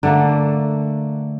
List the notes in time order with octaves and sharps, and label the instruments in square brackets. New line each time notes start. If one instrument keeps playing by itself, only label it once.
[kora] D3 A3 A#3